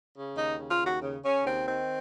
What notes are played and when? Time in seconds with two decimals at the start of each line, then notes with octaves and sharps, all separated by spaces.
0.16 C#3
0.36 D#2 D#4
0.58 C#3
0.69 F4
0.80 D#2
0.85 F#4
1.02 C#3
1.23 C#3 C#4
1.44 D#2 C4
1.66 D#3 C4